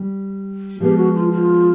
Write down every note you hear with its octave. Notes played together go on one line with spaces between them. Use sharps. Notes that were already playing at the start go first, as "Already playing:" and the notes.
Already playing: G3
F3 G#3 B3 G4
F#4
F4
F4